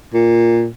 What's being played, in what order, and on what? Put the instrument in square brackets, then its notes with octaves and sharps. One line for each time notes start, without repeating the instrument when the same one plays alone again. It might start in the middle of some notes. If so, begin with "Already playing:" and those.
[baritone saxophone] A#2